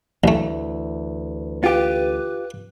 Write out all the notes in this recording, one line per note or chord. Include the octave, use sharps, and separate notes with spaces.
A1 D2 E3 A3
F4 G4 B4